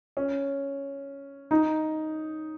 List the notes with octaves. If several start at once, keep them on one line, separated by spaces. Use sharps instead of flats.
C#4
D#4